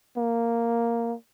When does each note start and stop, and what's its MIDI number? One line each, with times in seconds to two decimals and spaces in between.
0.17 1.15 58